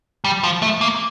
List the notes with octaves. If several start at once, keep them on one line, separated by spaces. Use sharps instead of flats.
G3
F3
A3
A#3